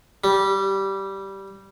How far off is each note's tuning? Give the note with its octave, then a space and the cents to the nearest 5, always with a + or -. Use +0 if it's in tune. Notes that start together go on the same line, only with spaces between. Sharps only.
G3 -10